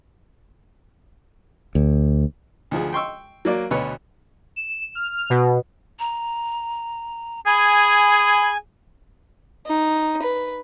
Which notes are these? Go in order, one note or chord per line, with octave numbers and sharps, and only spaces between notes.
D2
D2 F3 G#4
G5 C6 C#6 E6
F#3 A#3 D5
D2 B2 B4 C#5
E7
F6
B2
A#5
G#4 G#5 B5
D#4
B4